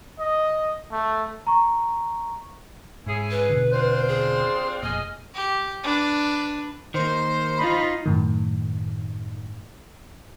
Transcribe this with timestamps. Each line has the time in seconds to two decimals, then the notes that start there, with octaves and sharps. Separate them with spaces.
0.19 D#5
0.92 A3
1.47 A#5 C#6
3.07 G#2 C#4 E4 G#4
3.31 B4
3.49 E2 B2 D3
3.72 C4 D4 F4 C5
4.09 G#4
4.83 F1 A#2 G#4 D#5 F6
5.34 G4
5.83 D4 B4
6.94 D#3 A#3 C5
7.58 D#4 F4 B5
8.06 F#2 A2 D#3